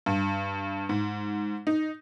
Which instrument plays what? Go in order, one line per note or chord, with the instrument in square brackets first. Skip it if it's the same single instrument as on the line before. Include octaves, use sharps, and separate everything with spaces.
[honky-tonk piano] G2
G#2
D#4